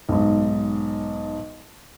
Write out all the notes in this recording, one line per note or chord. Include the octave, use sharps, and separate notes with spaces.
B1 G#2